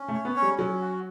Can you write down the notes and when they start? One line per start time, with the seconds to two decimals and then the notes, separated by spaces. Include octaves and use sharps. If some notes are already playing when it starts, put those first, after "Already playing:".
Already playing: C#4
0.08 A3
0.14 C#5
0.25 B3
0.36 C#4
0.42 G3
0.58 F#3 C#4
0.81 F#4